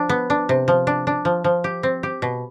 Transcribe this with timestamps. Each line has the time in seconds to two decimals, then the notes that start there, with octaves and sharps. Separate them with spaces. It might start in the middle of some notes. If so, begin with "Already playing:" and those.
Already playing: F3 D4
0.09 B3
0.30 D4
0.49 C3
0.68 F3
0.87 D4
1.07 D4
1.25 F3
1.44 F3
1.64 G4
1.83 C4
2.03 G4
2.22 B2